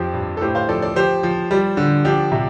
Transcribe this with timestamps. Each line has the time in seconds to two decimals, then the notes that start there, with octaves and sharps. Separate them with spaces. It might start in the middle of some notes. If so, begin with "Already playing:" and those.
Already playing: F2 F3 G4 C5
0.14 G2
0.37 A4
0.41 A2 G4 C5
0.55 C5 F5
0.69 F3 A4 D5
0.82 A4 D5
0.96 F3 G4 C5
1.23 F3
1.51 G3
1.77 D3
2.05 F3 D4 G4
2.32 C3